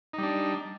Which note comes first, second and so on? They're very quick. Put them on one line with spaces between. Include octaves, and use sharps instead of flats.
D#4 G3 D4